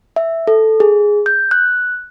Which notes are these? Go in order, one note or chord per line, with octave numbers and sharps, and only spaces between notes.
E5
A4
G#4
G6
F#6